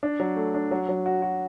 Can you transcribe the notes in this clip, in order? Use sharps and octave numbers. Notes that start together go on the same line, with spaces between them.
D4
F#3
A3
D4
F#3
F#3
F#4
F#4